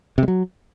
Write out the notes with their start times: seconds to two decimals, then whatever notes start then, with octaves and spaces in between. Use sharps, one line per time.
0.18 C3
0.23 G#3
0.28 F#3